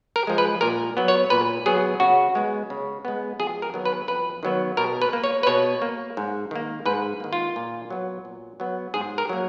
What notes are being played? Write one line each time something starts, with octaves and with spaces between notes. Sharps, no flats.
A#4
F3 G#3
B4
A#2 A#4
F#3 B3
C#5
A#2 B4
F#3 B3 G#4
C#3 F#4
G#3 B3
C#3
G#3 B3
F2 G#4
A#4
D#3 F#3 B3
B4
F2 B4
D#3 F#3 B3
B2 A#4
B4
A#3
C#5
B4
B2 C#5
A#3
G#2
D#3 A#3
G#2 B4
D#3 A#3
F4
A#2
F#3 B3
A#2
F#3 B3
G#2 G#4
A#4
F#3 A#3